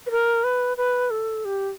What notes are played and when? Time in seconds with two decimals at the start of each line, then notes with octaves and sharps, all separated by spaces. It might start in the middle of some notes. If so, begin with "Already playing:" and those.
0.06 B4
0.11 A#4
0.44 B4
0.77 B4
1.10 A4
1.45 G4